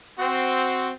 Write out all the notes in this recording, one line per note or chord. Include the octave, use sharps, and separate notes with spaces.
C4 F#4